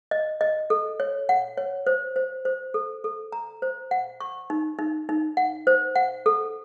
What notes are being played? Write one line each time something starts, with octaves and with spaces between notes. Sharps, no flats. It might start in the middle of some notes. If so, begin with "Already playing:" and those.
D#5
D#5
A4
C#5
F#5
C#5
C5
C5
C5
A4
A4
A#5
C5
F#5
C#6
D#4
D#4
D#4
F#5
C5
F#5
A4